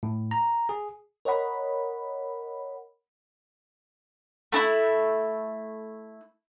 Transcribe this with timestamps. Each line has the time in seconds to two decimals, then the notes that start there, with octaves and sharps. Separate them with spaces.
0.03 A2
0.31 A#5
0.69 G#4
1.25 A#4 C#5 D#5 F#5 B5
4.52 A3 D4 E4